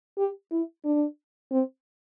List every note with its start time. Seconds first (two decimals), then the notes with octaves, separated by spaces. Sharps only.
0.18 G4
0.51 E4
0.85 D4
1.52 C4